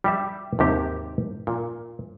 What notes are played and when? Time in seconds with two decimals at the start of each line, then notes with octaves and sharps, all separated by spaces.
0.04 G3 G4 E5
0.59 D#2 G#2 C3 G4
1.47 A#2